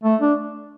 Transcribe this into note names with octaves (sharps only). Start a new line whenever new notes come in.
A3
D4